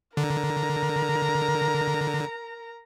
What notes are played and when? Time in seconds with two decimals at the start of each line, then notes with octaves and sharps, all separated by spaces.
0.17 D3 A#4 A#5